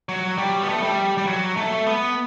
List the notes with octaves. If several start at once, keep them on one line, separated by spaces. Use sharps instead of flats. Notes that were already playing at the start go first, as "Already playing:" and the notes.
F#3
G3
B3
A3
G3
G3
F#3
A3
B3